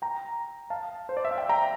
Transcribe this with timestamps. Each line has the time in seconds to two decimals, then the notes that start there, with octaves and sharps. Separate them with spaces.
0.02 G5 A#5
0.70 F5 A5
1.09 C5
1.17 D5
1.25 E5
1.31 F5
1.38 E5 G5
1.49 G5 A#5